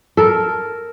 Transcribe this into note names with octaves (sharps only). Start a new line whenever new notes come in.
A4 A#4